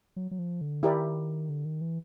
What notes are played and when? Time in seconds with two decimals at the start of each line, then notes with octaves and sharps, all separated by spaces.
0.16 F#3
0.31 F#3
0.39 F3
0.61 D3
0.82 D#3 E4 G4 A#4 D5
1.49 D3
1.65 D#3
1.81 E3